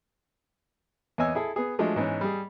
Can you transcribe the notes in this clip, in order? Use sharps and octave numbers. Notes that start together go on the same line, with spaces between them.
E2 B3 C#5 D#5 G#5 E6
E4 G#4 A4
B3 G#4
F3 F#3 G#3 A3 D4
G#2 E3 B3 C#4
G3 G#4